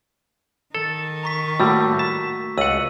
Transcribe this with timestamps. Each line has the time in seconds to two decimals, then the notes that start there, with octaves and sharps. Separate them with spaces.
0.75 D#3 A4 A6
1.23 A#5 C#6 B6
1.60 A2 G3 A3 A#3 F#4 E6
1.99 A5 B6
2.58 C#2 F#5 E6 D#7 F#7